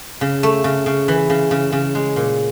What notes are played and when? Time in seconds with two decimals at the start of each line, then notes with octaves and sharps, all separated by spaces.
0.21 C#3
0.43 A3
0.64 C#3
0.86 C#3
1.08 E3
1.30 C#3
1.51 C#3
1.73 C#3
1.95 G#3
2.16 A#2